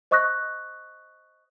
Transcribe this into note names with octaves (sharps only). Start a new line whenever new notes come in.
C5 D#5 C#6 D#6 F#6 A#6